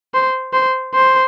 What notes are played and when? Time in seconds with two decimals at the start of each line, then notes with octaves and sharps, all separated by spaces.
0.14 C5
0.53 C5
0.95 C5